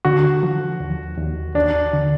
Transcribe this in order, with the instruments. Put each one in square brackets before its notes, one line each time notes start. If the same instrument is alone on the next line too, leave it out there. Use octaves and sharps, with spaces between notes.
[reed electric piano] D3 [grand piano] F#4
[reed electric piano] F3
D#2
D#2
[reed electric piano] D#2 [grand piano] D4
[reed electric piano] D3